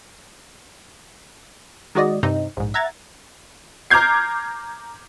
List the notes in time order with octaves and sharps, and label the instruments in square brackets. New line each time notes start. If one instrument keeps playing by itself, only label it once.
[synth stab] D#3 G#3 F#4 D5 D#5
G2 C3 C4 D#4
A#1 G#2
E5 F#5 A#5 G#6 A6
[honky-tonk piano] A#5 D6 F6 G6 G#6 C7